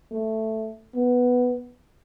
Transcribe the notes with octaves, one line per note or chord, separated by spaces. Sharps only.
A3
B3